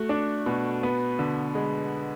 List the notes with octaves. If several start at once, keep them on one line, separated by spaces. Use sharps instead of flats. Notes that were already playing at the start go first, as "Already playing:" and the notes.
Already playing: A3 F#4
D4
B2
B3
D3
G#3